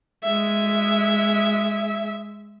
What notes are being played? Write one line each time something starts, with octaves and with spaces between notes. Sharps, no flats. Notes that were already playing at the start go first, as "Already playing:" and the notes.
G#3 E5